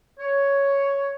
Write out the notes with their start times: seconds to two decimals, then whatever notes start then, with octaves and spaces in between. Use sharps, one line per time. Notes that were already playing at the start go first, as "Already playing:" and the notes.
0.18 C#5